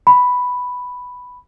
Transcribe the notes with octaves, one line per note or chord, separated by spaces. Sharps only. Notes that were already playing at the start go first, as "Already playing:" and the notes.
B5